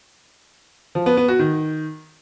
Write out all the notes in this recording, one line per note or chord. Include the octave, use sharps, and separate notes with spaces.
F3
B3
B3
F#4
D#3